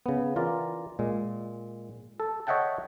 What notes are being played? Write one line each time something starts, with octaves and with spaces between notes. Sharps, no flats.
C#3 B3
E3 F4 A#4 D5
A#2 G#3
A4
C#5 D#5 E5 F#5 G5 A5